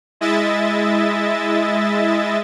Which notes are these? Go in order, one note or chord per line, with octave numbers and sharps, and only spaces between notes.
G#3 E4 D#5 E5 A6